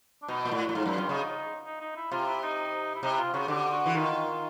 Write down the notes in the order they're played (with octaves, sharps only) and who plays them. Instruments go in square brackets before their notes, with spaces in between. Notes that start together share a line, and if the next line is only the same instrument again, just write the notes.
[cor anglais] D4
[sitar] B2 [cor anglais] D#4
[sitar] A#2 [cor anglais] E4
[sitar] A2 [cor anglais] F4
[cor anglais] F#4
[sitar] A2
[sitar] G#2 [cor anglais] F4
[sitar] F#2 [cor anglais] E4
[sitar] G2 [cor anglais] F4
[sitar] C#3 [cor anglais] D#4
[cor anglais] D#4
D#4
E4
[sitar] C3 [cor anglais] F4
[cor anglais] E4
D#4
E4
[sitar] C3 [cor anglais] D#4
[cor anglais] E4
F4
[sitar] C#3 [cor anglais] F#4
[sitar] D3 [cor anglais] G4
[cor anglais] F#4
[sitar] E3
[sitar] D#3 [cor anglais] F4